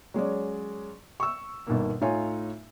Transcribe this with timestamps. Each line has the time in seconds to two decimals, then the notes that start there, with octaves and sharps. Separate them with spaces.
0.14 F#3 G#3 C#4 D5
1.20 C#6 E6
1.67 G1 B2 D#3 A#3
2.01 A2 D#4 F4 C#5 G#5